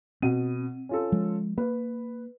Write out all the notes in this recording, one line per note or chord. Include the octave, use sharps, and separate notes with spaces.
B2 C4 D#7
C#4 F4 A4
F3 G#3
A#3 B4